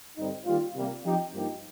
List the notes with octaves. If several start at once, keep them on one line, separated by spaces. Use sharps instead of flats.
G2 D3 G3 C4 D#4
D#3 G3 A#3 F4
C3 G3 A#3
F3 C4 D#4 G4
G2 F3 A#3 D#4 G4